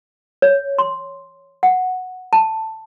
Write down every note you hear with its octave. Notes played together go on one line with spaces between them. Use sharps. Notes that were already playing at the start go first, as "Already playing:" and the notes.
C#5
C6
F#5
A5